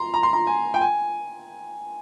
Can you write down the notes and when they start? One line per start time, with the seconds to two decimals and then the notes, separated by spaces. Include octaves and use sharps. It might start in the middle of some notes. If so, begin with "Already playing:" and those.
Already playing: A#5 C6
0.14 A#5
0.23 C6
0.33 A#5
0.47 G#5
0.74 G5
0.81 G#5